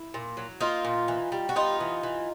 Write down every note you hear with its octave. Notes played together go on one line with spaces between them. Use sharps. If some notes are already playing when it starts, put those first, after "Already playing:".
Already playing: E4
A#2
F#3
A#3 D#4 F4
A#2
E3
G3
F#4
B3 D#4 F4
E3
E3